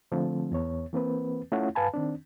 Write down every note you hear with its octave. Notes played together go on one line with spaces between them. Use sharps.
D3 F3 A3 C4
E2 B3 C#5
E3 A#3 C4 B4
A3 C#4 E4 F4 C#5 F#5
G2 B4 F5 G#5 A5 B5
D#3 C4 D4